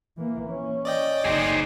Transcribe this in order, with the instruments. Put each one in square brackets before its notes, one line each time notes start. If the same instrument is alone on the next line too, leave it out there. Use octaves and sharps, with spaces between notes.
[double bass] E3 A#3
C#4
[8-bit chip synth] D5 D#5 G5
[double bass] F#1 D#4 [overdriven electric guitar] C4 G#4